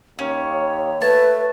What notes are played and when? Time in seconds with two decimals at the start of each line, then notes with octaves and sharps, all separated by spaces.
0.19 D#2 C#4 C#5
1.02 A3 B4 A5